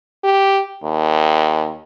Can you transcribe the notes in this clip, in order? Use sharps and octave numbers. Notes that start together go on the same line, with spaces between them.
G4
D#2